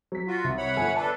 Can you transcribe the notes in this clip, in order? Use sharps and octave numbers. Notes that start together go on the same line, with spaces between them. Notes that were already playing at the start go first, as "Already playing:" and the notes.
F#3 B6
F4 F#4
C2
C#5 F#5 B5
G1 A4 G#5
D4 A4 B4 A5